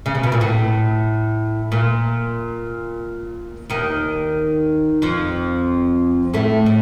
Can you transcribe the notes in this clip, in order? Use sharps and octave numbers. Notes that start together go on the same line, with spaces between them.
C#3
C3
B2
A#2
A2
A#2
D#2 D#3
F2 F3
A2 A3
A2